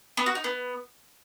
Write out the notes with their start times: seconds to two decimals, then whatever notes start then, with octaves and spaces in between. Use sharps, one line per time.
0.17 B3
0.26 F#4
0.35 D#4
0.44 B3